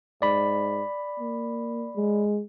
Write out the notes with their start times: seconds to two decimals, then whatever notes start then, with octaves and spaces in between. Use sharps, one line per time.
0.22 G#2 D5 B5
1.20 A#3
1.96 G#3